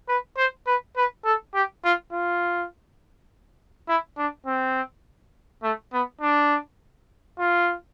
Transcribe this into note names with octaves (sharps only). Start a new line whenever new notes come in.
B4
C5
B4
B4
A4
G4
F4
F4
E4
D4
C4
A3
B3
D4
F4